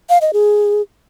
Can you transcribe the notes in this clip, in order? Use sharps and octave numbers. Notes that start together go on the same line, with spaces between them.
F5
D#5
G#4